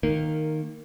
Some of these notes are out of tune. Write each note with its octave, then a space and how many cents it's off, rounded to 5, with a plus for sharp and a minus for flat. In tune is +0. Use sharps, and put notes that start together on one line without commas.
D#3 -5 A#3 -10